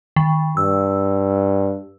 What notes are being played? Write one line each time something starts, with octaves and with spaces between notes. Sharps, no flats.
D#3
G2 E6